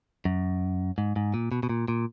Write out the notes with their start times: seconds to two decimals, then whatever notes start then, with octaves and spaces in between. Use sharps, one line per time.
0.25 F#2
0.98 G#2
1.16 G#2
1.34 A#2
1.52 B2
1.63 B2
1.69 A#2
1.88 A#2